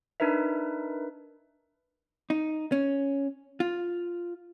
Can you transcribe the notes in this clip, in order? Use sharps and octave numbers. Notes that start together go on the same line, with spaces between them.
D4 D#4 A#4 B4 E5
D#4
C#4
F4